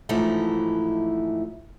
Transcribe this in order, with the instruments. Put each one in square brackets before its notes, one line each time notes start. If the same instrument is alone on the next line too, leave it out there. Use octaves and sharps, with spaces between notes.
[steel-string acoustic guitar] G#2 E3 F3 A3 D#4 E4